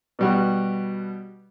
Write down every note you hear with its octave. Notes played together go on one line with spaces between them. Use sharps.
B2 G3 F#4